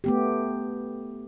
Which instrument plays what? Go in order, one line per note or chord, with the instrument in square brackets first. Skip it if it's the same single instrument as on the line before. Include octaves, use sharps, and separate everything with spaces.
[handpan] A3 B3 G4